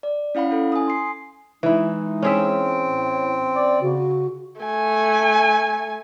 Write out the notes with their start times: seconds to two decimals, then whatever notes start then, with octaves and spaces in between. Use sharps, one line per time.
0.03 D5
0.35 C#4 E4 F5 F#5 B5
0.51 C#4 E4 A4
0.72 G#5 D#6
0.88 C6 C7
1.63 E3 G#3 D#4 E4
2.22 C4 C#4 G#4 E5
2.87 A2
3.55 D5
3.82 C#3 F#4
4.62 A3 G#5